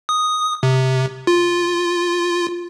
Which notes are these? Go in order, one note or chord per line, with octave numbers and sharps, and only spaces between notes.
D#6
C3
F4